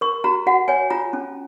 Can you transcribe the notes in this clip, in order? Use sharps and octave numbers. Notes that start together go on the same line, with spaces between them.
A#4 C#6
F#4 A#5
F#4 F#5
C#5 G#5
F4 A#5
C#4